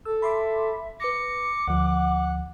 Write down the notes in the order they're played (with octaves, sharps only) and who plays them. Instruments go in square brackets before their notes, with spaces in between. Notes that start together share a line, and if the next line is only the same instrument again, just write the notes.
[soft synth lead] A4 [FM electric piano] E6
[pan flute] E5 [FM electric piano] B5 C6 D6
[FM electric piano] B4 A#6 [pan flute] D6 [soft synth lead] C#7
[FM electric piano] D2 F3 [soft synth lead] F#5